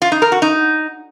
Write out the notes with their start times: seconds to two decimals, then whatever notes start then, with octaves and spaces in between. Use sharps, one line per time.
0.02 F4
0.12 D#4
0.22 A#4
0.32 F#4
0.42 D#4